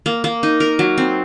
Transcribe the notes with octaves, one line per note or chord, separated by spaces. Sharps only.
A#3
A#3
D#4
A#4
F#3
C4